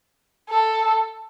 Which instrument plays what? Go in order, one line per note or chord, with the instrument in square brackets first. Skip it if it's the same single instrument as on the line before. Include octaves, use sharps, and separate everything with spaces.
[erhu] A4